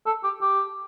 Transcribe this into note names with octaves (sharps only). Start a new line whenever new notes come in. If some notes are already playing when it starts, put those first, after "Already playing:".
A4
G4
G4